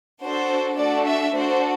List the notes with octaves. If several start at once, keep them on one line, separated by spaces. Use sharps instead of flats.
D4 F#4 A4 C5
A3 D4 F#4 A4 D5
E5
D4 F#4 A4 C5